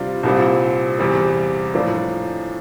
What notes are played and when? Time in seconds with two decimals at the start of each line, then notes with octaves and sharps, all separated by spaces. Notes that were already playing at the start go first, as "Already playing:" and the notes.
Already playing: C3 G3 D4 F4
0.23 C2 A#2 G3 C4
0.99 E2 C3 G3
1.74 A2 F3 A#3 D4